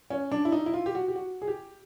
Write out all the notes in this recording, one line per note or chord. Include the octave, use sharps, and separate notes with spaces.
C#4
D4
E4
D#4
E4
F4
G4
F#4
G4
F#4
G#4
G4